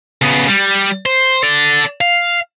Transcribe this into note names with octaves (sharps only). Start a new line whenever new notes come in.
C#3 B3
G3
C5
A4 D5
F5